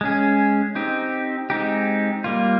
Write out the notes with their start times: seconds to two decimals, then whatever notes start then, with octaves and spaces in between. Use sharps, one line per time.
0.01 G#3 C#4 G#4
0.75 C4 D#4 G4
1.50 G#3 C4 D#4 G4
2.24 G3 A#3 F4